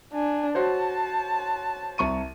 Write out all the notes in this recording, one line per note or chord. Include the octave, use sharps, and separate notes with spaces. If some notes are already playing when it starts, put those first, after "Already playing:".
D4 G#5
F#4 C5 C#5 A5
C2 C#6 D#7